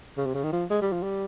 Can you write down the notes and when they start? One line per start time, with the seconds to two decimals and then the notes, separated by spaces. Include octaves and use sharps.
0.17 C#3
0.26 C3
0.34 C#3
0.43 D#3
0.52 F3
0.70 G#3
0.81 G3
0.92 F3
1.03 G3